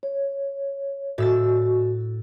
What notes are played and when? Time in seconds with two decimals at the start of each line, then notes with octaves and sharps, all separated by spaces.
0.03 C#5
1.18 A2 F#4 E6 A6